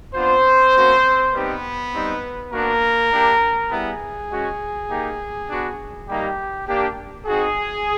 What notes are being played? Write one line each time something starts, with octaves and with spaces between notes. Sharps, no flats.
B3 C4 D4 F4 C5
A#3 C#4 F#4
G3 B3 C4 D#4 G4 B4
G3 C4 D#4
A#3 B3 D4 F#4 A#4
A#3 D4 G4
G3 B3 E4 G#4
G#3 C#4 F#4
A#3 D#4 G4
B3 D4 F#4
G3 A#3 D#4 G4
A#3 D4 G4
C4 D#4 F#4 G#4